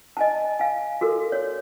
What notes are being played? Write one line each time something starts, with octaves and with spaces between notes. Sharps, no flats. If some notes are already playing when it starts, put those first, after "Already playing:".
D#5 G#5 A5
F5 G#5
F#4 A4 A#4
C#5